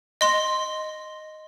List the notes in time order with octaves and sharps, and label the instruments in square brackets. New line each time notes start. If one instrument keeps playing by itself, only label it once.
[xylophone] D#5 C6